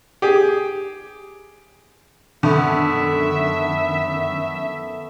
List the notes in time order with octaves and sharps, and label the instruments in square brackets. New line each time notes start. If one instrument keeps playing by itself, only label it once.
[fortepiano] G4 G#4
[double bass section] F#2 D#3 [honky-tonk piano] D3 [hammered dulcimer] A3 B3 A4 [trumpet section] E5